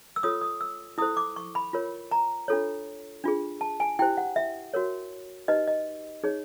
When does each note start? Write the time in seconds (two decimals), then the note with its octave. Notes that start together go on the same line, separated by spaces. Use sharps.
0.16 E6
0.23 F4 A4 C#5 D#6
0.41 D#6
0.61 E6
0.98 E4 A4 C5 D#6
1.17 D6
1.36 C#6
1.55 B5
1.73 F4 A#4 C#5
2.11 A#5
2.48 D4 F4 A4 C#5
3.24 D4 F4 G#4
3.61 A5
3.80 G#5
3.99 E4 G4 C5 G5
4.17 F#5
4.36 E5
4.74 F#4 A#4 C#5
5.48 D#4 G4 B4 D#5
5.67 D#5
6.24 D#4 G#4 C#5